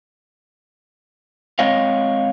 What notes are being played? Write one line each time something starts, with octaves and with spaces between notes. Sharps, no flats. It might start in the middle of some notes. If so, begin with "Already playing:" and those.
G#3 C4 C#5 D#5 F5